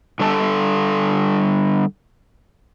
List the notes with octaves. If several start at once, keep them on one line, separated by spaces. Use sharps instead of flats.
D3 G3 A4 A5